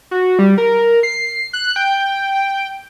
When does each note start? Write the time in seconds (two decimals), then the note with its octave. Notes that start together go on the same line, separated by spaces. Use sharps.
0.11 F#4
0.39 G3
0.58 A#4
1.03 C7
1.53 F#6
1.76 G5